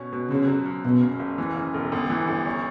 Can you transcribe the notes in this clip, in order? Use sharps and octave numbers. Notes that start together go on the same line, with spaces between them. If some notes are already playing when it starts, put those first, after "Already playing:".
Already playing: B2 C#4
B2
F#2 C#3
F#3
F#2
F#1 B2
C#3
F#1
E3
C#3
E1
G1
E3
G1
C#4